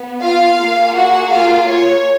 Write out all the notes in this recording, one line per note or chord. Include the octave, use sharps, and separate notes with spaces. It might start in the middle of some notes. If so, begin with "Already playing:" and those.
Already playing: B3
F4 F5
A#3 F4 G#4
F#4 F#5
F4 F5
C#5